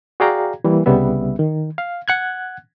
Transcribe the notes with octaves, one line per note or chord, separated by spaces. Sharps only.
F#4 G#4 D5 F5 G5 A#5
E3 G3 A#3
C2 C#3 G3 B3 E5
D#3
F5
F#5 F#6 G#6